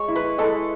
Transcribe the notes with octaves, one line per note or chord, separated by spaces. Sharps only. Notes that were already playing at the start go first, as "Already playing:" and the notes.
Already playing: G#3 C#5
E4
B4
G#3 A4